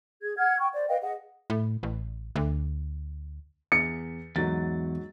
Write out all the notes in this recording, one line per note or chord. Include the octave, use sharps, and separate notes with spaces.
G#4 G#6
F#5 F6 G#6
G5 C#6
C5 D5
B4 D#5 F5 G5
G#4 D#5 F#5
A2
A1
D2
E2 C#7
E2 G#2 F#3 A6